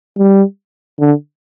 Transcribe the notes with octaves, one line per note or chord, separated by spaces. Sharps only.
G3
D3